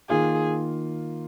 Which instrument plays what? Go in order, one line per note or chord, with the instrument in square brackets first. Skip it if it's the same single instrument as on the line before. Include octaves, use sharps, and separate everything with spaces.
[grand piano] D#3 A#3 F4 [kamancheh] G#4